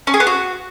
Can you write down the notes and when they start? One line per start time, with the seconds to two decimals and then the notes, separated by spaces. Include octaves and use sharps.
0.07 C#4
0.14 G#4
0.20 B3
0.27 F#4